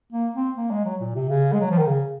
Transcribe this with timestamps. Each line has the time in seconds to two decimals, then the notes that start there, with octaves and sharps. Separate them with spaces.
0.13 A#3
0.35 C4
0.57 A#3
0.71 G#3
0.85 F#3
1.00 A#2
1.15 C3
1.29 C#3
1.53 G#3
1.60 F#3
1.70 F3
1.78 D#3
1.86 C#3